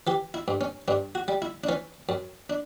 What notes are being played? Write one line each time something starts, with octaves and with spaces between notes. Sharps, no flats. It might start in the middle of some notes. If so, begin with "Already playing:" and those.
E3 G4
E4
G2
C#4
G2 D4
F#4
G3
E4
D4
E3 C#4
F#2
D4